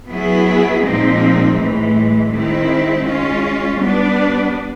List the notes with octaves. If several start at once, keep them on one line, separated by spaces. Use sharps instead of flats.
F#3 B3 E4 G#4
A#2 F3 G#3 C4 D#4
A2 E3 G#3
D#3 G#3 C4 E4
G#3 C#4 F4
G3 B3 D4